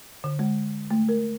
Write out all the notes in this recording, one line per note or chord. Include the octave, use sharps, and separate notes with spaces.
D3
G#3
A3
A#4